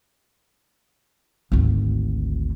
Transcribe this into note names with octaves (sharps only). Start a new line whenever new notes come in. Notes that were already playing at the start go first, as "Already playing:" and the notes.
G#1 D2